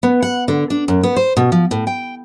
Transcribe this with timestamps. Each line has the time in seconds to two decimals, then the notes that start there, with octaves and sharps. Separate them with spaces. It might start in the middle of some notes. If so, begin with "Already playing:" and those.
0.03 B3
0.22 F#5
0.48 D3
0.70 D4
0.88 F#2
1.03 B3
1.16 C5
1.37 B2
1.52 F3
1.71 A2
1.87 G5